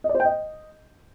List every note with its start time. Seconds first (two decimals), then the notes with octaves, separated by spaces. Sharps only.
0.04 D#5
0.09 D5
0.15 C5
0.20 G5
0.25 D#5